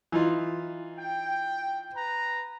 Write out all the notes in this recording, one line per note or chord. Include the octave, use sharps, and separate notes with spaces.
E3 D#4 F4
G5
B4 A#5